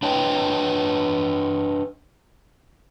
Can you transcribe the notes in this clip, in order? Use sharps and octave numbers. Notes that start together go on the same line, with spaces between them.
D4 B4 C#5 D#5 G5